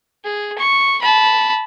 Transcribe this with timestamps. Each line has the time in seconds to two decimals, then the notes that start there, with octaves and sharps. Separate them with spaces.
0.24 G#4
0.58 C#6
1.01 A5 B5